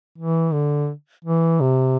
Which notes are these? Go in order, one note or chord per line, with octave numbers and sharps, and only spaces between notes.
E3
D3
E3
C3